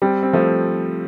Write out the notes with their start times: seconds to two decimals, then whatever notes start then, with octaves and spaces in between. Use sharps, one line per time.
0.02 G3 C4
0.23 C4
0.33 F3 A3